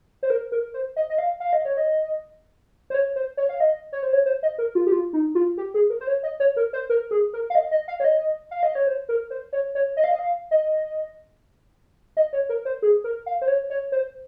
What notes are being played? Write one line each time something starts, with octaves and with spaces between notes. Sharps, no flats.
C5
A#4
A#4
C5
D#5
D#5
F5
F5
D#5
C#5
D#5
C5
C#5
C5
C#5
F5
D#5
C#5
C5
C#5
C5
D#5
A#4
F4
G4
F4
D#4
F4
G4
G#4
A#4
C5
C#5
D#5
C#5
A#4
C5
A#4
G#4
A#4
F5
D#5
D#5
F5
C#5
D#5
F5
D#5
C#5
C5
A#4
C5
C#5
C#5
D#5
F5
D#5
F5
D#5
D#5
C#5
A#4
C5
G#4
A#4
F5
C5
C#5
C#5
C5